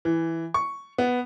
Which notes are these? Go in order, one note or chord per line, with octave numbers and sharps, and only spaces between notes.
E3
C#6
B3